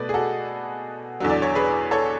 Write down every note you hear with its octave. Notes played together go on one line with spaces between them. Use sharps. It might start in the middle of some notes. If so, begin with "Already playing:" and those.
Already playing: B2 A3 B4 D5
G#4
F#4 A4
E2 D3 F#3
D5
C#5
G#4 B4
A4 C#5